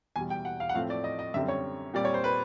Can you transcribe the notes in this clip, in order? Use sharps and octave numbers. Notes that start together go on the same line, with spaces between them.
E2 B2 G3 G#5
G5
F#5
F5
F#5
A2 F3 A3 C4 F5
D5
D#5
D#5
F#2 D3 G3 C4 E5
C#5
A#2 G3 C4 D5
C#5
C5
B4